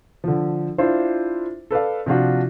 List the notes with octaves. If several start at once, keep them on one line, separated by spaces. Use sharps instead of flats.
D3 F3
D4 E4 F4 C5
A4 B4 D5 F5
C3 F3 D4 F4 F#4